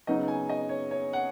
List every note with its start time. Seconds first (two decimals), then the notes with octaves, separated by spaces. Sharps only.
0.07 C#3 F#3 B3 D#4 D#5
0.28 G#5
0.49 D#5
0.69 C#5
0.91 C#5
1.13 F#5